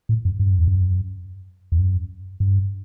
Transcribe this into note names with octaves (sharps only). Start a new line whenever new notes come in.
A2
F#2
G2
F#2
E2
F#2
E2
F#2
G2